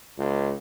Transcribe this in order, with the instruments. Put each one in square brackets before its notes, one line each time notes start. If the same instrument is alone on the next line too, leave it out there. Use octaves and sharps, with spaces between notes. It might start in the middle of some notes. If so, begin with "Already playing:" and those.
[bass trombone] C#2